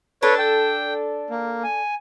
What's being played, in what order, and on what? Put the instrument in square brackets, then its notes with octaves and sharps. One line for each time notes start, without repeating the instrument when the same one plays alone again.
[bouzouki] D4 A4 [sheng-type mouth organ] B4 C#5
[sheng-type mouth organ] G5
A#3
G#5